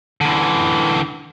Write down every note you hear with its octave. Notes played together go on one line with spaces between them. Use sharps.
D3 E3